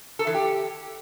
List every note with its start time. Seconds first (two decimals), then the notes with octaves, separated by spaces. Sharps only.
0.19 A4
0.27 E3
0.34 G4